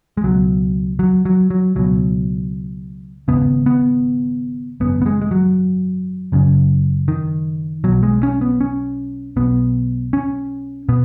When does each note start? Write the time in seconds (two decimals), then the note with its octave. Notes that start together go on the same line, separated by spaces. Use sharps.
0.17 G#3
0.24 C#2 B2 F#3
0.99 F#3
1.25 F#3
1.50 F#3
1.75 C#2 B2 F#3
3.28 F#2 C#3 B3
3.33 G#1
3.66 B3
4.80 G#1 F#2 C#3 B3
5.02 B3
5.06 G#3
5.22 G#3
5.31 F#3
6.32 F#1 F#2 C#3
7.08 D#3
7.84 B1 B2 F#3
8.03 G#3
8.23 C#4
8.41 B3
8.61 C#4
9.36 B1 B2 B3
10.13 C#4
10.89 B2 B3